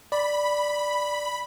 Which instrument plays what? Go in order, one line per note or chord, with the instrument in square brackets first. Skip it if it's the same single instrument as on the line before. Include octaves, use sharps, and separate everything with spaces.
[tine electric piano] D5 [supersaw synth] B5